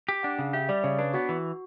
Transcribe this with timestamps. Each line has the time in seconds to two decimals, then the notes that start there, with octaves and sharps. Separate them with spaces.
0.09 G4
0.23 D4 F#5
0.39 C#3
0.53 G4 E5
0.69 G3 D5
0.84 C#3 C#5
0.99 D4 B4
1.14 B3 F#4
1.29 E3